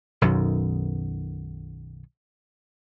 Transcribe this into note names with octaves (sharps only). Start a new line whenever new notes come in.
B1 F#2 B2 D#3